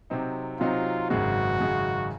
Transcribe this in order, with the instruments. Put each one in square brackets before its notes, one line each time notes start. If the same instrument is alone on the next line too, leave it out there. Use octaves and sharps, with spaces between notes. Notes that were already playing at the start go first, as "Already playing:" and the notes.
[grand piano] C3 F#3 C4 D#4
[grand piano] C3 F#3 C4 D#4 [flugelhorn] F4
[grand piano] G#1 F#2 C#3 G#3 [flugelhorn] F#4
[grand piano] G#1 F#2 C#3 G#3